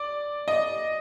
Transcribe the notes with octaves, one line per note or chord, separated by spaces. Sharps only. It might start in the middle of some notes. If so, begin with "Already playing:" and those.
Already playing: D5
D#5